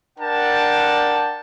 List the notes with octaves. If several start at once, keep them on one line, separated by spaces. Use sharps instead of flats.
D4 A#4 F#5 G5 A5